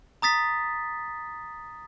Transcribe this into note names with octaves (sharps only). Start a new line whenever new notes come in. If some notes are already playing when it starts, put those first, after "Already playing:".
A#5 D#6 A6 B6